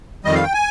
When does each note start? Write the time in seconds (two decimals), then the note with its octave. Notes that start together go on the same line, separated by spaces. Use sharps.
0.25 F2 D#3 G3 D#5
0.35 F5
0.43 G5
0.54 G#5